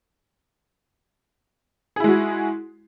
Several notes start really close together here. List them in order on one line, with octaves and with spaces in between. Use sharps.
G#4 E4 G#3 F#4